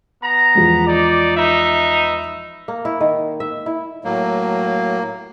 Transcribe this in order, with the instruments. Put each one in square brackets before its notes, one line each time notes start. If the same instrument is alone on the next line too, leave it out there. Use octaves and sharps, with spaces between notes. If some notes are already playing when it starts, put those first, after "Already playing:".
[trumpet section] B3 A#5
[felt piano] E2 F3 G#3
[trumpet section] D#4 D5
D#4 B4 E5
[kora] A#3
E4
D#3
E5
E4
[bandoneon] A2 F#3 [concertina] A#3